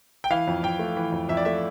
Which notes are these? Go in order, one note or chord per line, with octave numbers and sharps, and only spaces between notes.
G5
E3 F5
F2
F2 G5
A3
E3
F2
F2 E5
D5
A3 E5